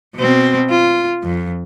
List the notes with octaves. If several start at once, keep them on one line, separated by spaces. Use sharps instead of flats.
B2 C4
F4
F2